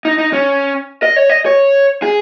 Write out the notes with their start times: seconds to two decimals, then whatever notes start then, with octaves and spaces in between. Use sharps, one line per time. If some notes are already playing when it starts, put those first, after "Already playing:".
0.05 D#4
0.18 D#4
0.33 C#4
1.03 D#5
1.16 C#5
1.29 D#5
1.46 C#5
2.02 G#4